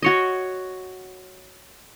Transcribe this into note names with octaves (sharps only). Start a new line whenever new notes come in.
F#4 C#5 D#5